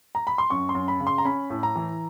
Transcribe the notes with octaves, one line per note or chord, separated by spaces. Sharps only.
A#5
B5
C6
F#2 C#6
C6
F#2
B5
C#3
C6
A#5
C#4 B5
A2
A#5
E3